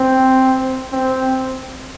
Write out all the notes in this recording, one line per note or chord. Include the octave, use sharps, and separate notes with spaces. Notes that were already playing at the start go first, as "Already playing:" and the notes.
Already playing: C4
C4